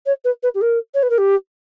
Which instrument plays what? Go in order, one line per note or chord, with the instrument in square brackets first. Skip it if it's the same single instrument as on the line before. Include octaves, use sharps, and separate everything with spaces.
[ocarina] C#5
B4
B4
G4
A#4
C#5
B4
A#4
G4